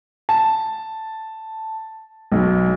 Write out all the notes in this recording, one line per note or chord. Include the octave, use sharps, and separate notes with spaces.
A5
B1